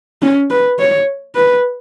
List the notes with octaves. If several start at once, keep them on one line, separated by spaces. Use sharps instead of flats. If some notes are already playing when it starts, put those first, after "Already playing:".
C#4
B4
C#5
B4